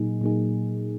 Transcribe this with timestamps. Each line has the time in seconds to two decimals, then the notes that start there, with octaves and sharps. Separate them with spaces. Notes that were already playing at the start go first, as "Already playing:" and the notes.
Already playing: A#2 F#3 A#3 D#4 G#4
0.21 A#2 F#3 A#3 D#4 G#4